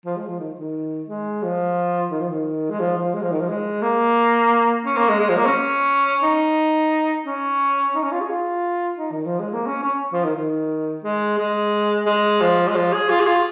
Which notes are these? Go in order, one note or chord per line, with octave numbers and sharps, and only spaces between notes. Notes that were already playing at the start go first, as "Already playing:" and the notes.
F3
G#3
F3
D#3
D#3
G#3
F3
D#3
F3
D#3
G#3
F3
F3
G#3
F3
D#3
F3
G#3
A#3
C#4
A#3
G#3
G#3
F3
A#3
C#4
D#4
C#4
D#4
C#4
F4
G#4
F4
D#4
D#3
F3
G#3
A#3
C#4
C#4
F3
D#3
D#3
G#3
G#3
G#3
F3
G#3
F3
G#4
F4
G#4
F4